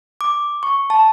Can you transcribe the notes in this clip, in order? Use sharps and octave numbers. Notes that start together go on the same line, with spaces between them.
D6
C#6
A5